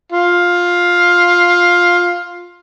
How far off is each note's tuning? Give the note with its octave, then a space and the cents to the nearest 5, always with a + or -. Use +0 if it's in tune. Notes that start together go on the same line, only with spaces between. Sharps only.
F4 +10